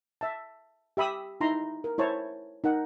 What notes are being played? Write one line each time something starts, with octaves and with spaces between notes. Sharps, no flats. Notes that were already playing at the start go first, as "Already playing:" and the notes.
E5 A5
G4 E5 B5 D#6 E6
D#4 E4 A#5 C6
A#4
E4 C5 C#5 A5
D#4 A#4 F#5